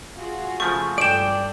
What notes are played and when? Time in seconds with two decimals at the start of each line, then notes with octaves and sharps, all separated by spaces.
0.15 F4 F#4 G#4
0.60 C#3 F3 A3 C#6
0.98 G2 D4 A4 D5 G5 D7 E7